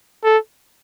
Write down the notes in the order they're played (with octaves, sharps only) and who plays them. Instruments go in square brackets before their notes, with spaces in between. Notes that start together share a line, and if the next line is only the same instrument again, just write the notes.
[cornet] A4